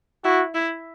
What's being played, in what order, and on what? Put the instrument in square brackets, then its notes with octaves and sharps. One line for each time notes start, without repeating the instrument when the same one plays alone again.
[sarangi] E4 [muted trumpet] F#4
[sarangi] E4